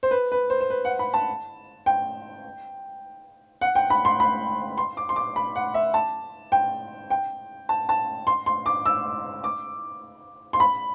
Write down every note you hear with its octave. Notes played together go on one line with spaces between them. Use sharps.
C5
B4
B4
C5
C5
B4
F#5
B5
A5
G5
F#5
G5
B5
C6
B5
C6
D6
C6
D6
B5
F#5
E5
A5
G5
G5
A5
A5
C6
C6
D6
E6
D6
C6
B5